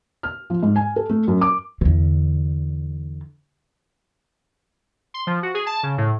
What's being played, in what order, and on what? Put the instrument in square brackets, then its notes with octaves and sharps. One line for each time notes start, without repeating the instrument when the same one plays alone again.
[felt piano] F6
F3
G#2
G#5
A4
A3
F#2
D6
[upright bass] E2 D3
[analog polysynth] C6
F3
F#4
G#4
A5
C#3
A2